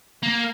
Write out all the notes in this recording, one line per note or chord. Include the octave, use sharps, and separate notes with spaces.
A#3